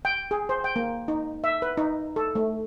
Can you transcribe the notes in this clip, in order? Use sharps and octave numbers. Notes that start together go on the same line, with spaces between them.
G5
G#4
C5
G5
A#3
D#4
E5
B4
D#4
A4
A3